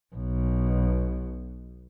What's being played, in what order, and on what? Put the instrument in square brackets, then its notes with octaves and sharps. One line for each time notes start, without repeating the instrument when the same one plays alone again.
[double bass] B1 B2